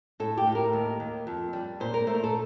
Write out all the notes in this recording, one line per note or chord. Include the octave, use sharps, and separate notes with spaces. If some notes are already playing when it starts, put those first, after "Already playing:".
A2 A4
G4
A2
A#4
D#2
D#2
F2
G3
A#2 C5
A#4
A3 C5
A4